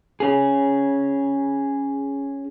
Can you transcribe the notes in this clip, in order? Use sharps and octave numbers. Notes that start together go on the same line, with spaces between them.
C#4 G#4